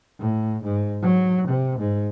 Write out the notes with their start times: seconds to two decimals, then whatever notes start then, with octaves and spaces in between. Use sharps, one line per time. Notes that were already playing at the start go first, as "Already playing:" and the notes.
0.19 A2
0.64 G#2
1.02 F#3
1.48 C3
1.79 G#2